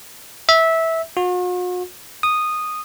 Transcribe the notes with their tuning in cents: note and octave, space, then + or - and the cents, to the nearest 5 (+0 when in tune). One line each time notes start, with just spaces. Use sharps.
E5 -15
F#4 -45
D#6 -10